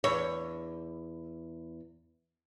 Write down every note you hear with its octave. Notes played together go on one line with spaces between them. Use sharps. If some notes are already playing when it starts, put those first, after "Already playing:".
E2 C#5